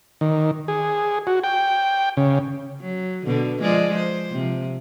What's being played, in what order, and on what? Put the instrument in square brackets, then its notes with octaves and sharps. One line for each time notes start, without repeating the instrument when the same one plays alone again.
[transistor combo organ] D#3
G#4
F#4
G5
C#3
[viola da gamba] F#3
B2 D3
F3 G#3 D5
C5
C3 F3